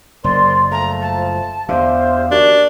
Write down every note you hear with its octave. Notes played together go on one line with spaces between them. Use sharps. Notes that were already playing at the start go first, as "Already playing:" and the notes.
F#1 A#4 C5 D5 C6
F3 A3 A#5
A5
E2 D3 G4 C5 E5 F5
D#2 D4 F#4